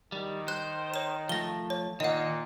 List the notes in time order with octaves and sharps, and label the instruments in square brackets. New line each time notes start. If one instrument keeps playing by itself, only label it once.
[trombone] D#3 [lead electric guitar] G3
[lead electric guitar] C5 [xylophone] F#6
[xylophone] C#5 E7
[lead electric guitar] F3 A3 [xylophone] A#6 G7
[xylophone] C#5
[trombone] A#2 [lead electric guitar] D#3 D#4 [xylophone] D#5 F#5